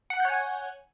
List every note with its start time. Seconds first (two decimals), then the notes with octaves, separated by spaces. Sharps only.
0.10 F#5
0.15 F#6
0.20 G6
0.25 C#5
0.30 G#5